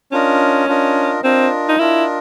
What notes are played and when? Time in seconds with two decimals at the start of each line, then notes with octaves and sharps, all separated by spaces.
0.12 C#4 D4 F4 A#4 D#5
0.68 D4 F4 A#4 D#5
1.24 C4 D4 F4 A#4 D#5
1.69 D#4
1.79 D4 E4 F4 A#4 D#5